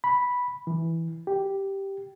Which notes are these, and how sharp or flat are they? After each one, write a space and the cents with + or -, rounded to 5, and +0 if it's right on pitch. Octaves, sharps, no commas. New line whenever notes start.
B5 -5
E3 -5
G4 -5